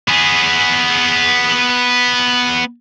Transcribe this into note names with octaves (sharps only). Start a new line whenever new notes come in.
B3 G#4